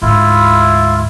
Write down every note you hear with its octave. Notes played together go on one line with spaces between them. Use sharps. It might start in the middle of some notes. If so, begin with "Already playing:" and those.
D2 G#2 E4 F4